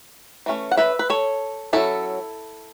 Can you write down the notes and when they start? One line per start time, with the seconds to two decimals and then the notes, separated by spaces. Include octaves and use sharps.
0.46 E3 A3 C#4
0.71 F#5
0.77 B4 E5
0.99 B4
1.10 A4 C#5
1.73 F#3 A3 C#4 E4 A4